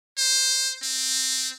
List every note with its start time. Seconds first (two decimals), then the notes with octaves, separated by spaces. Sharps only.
0.18 C5
0.83 C4